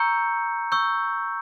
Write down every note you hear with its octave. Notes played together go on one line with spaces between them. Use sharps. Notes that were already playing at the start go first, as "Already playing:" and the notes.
Already playing: A#5 C#6 E6 G6 C#7
C#6 E6 G6